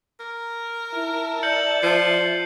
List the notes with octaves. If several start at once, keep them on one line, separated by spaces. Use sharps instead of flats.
A#4
E4 E5 A5
D5 G6 C#7 F#7
F3 C7